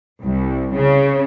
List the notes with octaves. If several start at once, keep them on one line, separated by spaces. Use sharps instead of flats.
C2
C#3